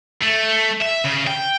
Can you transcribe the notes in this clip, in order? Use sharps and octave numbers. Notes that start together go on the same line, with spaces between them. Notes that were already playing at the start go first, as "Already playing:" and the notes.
A3
E5
C#3
G5